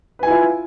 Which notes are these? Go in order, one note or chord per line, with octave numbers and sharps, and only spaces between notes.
E4 F4 B4 G#5